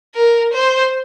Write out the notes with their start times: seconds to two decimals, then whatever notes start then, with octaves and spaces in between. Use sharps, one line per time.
0.15 A#4
0.53 C5